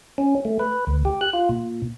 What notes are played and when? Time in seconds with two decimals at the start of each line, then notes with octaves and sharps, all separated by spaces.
0.18 C#4
0.45 A3
0.59 B4
0.87 D2
1.05 G4
1.21 F#6
1.33 F4
1.49 A#2